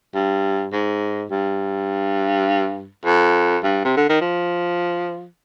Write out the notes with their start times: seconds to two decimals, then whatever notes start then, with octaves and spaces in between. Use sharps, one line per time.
0.14 G2
0.73 G#2
1.31 G2
3.05 F2
3.64 G2
3.85 C3
3.97 D3
4.09 D#3
4.21 F3